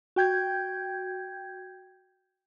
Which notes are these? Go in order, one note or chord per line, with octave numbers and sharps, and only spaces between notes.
F#4 G5 G6 G#6